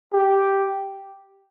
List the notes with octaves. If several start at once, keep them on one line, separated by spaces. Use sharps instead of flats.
G4